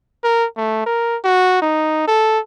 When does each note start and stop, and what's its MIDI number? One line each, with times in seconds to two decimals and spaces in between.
0.24 0.46 70
0.57 0.82 57
0.86 1.17 70
1.24 1.61 66
1.62 2.06 63
2.08 2.39 69